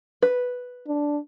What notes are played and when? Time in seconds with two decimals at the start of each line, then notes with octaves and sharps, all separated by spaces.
0.22 B4
0.88 D4